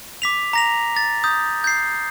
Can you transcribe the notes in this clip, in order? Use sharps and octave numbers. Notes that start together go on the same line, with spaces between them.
D6 B6 F7
A#5 A#6 F7
A6
D#6 G6
G6 C7